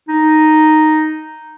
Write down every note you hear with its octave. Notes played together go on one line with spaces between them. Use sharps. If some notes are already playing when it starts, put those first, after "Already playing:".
D#4